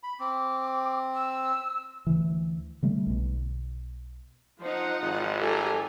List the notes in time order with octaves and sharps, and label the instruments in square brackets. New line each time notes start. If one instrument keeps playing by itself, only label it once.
[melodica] B5
[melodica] C4 [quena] D6
[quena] E6
[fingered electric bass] D2 E3
D3 G3 A3
B1 B2
[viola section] F3 D#4 F#5 [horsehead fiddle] C5
[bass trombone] G#1 [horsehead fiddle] F4
[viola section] G4 G#5 A#5 [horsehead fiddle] A4